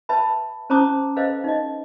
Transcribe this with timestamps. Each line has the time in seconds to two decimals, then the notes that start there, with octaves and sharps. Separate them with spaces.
0.09 B4 E5 A5 B5
0.70 C#4 C5 A5 A#5 D6 D#6
1.16 A4 B4 C5 D#5 F5
1.44 D#4 D#5